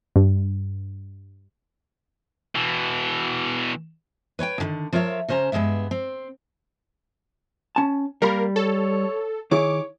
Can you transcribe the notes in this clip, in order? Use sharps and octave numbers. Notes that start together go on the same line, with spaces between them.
G2
B2 E3
B4 C#5 F#5 G5
D#2 D3 D#3
F3 F4 A#4 C#5 E5
C#3 C#4 C5 A5 A#5
G2 E3 G#3 B3 E5
C4
C#4 A5
G3 A#3 A#4 B5
A4 C#5
D#3 E4 G#4 C#5 D6